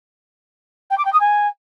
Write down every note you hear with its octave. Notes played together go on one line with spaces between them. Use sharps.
G5
D6
G5
D#6
G#5